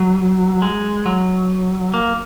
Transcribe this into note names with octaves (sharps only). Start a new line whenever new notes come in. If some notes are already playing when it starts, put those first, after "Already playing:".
Already playing: F#3
G#3
F#3
A#3